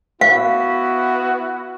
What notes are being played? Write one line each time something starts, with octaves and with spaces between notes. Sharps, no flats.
B3 E4 F#4 F5